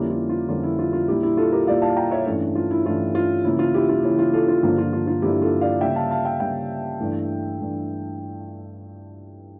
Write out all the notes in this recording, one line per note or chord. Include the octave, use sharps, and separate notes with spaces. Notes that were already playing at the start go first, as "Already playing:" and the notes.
Already playing: F2 D3 G3 A#3 C#4 E4 G4
F4
F4
F2 D3 G3 A#3 C#4 F4
E4
F4
F4
A#2 G3 A#3 E4 G4
E4 G4
F4 A4
G4 A#4
A#2 G3 A#3 D5 F5
F5 A5
G5 A#5
C#5 E5
G2 E3 A3 C#4
F4
E4
G2 E3 A3 C#4 F4
F4
C#3 E3 A#3 C#4 E4
F4
E4 G4
F4
C#3 E3 A#3 C#4 E4
F4
F4 A4
F4
G2 D3 F3 A#3 F4
F4
F4
F4
G2 D3 F3 A#3 E4 G4
F4 A4
D5 F5
C#3 G3 A#3 E5 G5
F5 A5
F5 A5
E5 G5
C#3 G3 A#3 E5 G5
G2 E3 A3
G2 E3 A3